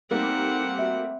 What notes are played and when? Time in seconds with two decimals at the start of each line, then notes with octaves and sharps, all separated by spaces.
0.11 G3 A3 A#3 C4 D#4 F#5
0.79 F#4 E5